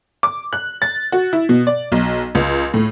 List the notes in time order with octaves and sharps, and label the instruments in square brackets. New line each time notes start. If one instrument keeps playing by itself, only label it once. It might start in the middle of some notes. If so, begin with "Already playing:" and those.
[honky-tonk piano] D6
F#6
A6
F#4
E4
B2
D5
B1
C#2
A2